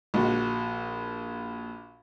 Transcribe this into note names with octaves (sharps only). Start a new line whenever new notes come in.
A#1 F#4